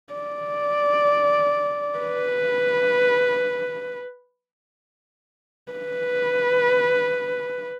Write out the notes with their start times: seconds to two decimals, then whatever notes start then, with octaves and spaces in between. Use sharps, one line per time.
0.13 D5
1.99 B4
5.72 B4